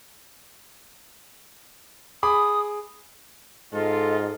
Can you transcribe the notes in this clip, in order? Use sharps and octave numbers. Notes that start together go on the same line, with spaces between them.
G#4 B5 D6 D#6
G#2 F4 A4 D#5